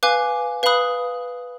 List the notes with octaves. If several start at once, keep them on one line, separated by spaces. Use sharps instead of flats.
B4 F5 G#5 D6 F#6
B4 F5 B5 D#6 F#6